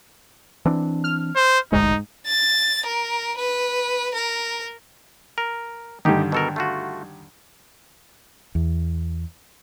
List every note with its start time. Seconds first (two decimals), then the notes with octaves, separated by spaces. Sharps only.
0.65 E3 C4 D4
1.04 F6
1.36 C5
1.72 E1 A1 D2 G#2 D#4
2.27 A6
2.86 A#4
3.37 B4
4.15 A#4
5.38 A#4
6.05 G2 D3 D#3 D#4 G4
6.32 B2 A4 A#4
6.56 A3 F4 F#4
8.55 E2